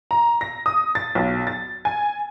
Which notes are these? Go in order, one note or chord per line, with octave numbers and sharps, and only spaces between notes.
A#5
A#6
D#6
A6
B1
A6
G#5